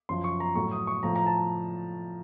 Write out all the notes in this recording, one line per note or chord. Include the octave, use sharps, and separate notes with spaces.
F#2 F3 C6
C#6
A#5
A2 F#3 C#6
D#6
C#6
A2 F3 A#5
A#5
A5